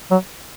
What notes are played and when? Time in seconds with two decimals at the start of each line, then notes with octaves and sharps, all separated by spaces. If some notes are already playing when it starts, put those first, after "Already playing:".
0.11 F#3